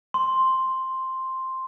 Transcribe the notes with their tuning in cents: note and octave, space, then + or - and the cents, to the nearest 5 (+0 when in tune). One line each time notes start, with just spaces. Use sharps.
C6 +5